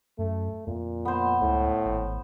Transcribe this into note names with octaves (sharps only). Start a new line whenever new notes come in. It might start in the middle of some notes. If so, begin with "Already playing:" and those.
F#2 A3
F2 A#2
B3 C5
C#2 A2
G#1